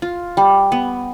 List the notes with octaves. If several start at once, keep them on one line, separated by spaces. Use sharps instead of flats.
F4
G3
B3